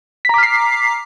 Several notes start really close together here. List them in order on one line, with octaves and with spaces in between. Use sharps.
B6 A#5 D6 F6 C7